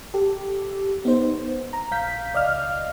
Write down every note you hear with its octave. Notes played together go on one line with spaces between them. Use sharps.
G4 A4
B3 D#4 C5
A#5
A#1 F5 G6 B6
C#2 D5 D#5 F5 F6